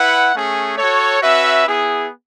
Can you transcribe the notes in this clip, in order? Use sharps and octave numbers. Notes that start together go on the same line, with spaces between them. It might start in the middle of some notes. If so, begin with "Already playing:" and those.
Already playing: E4 B4 F#5
A3 C#4 G#4
F#4 A4 C#5
C#4 F#4 B4 E5
B3 E4 G#4